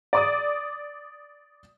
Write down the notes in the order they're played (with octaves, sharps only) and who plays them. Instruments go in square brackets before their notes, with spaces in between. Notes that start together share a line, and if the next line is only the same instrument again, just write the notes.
[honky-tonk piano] D5 D6 D#6